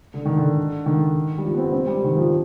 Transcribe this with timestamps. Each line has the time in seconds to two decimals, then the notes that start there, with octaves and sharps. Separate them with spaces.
0.14 D3
0.25 D#3
0.37 D3
0.86 D#3
1.38 G3
1.44 F3
1.54 B3
1.58 C4
1.72 C4
1.87 G3
2.04 D#3
2.17 F3